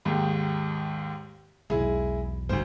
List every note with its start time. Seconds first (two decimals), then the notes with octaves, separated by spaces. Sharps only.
0.05 D#2 G#2 D#3
1.70 B1 E2 G#3 E4 G#4
2.49 G1 D2 A3 C5